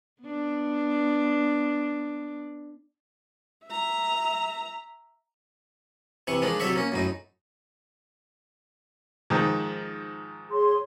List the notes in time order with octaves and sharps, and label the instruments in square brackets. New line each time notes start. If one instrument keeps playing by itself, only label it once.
[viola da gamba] B3 D4
[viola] E5 A#5
[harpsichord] C3 E3 C#6
D#3 F3 G#3 D4
C2 F#3 A4 C#5 E5 C#6
A#3 C#4
F#2 A2 D#4
[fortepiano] G#2 D#3 F3
[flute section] G#4 C#5 C6